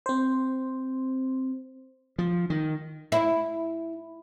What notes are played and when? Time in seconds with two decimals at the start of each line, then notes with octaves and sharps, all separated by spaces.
0.06 C4 C5
2.18 F3
2.50 D#3
3.12 E4